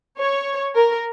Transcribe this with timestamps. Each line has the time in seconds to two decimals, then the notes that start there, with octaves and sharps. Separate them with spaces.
0.19 C#5
0.75 A#4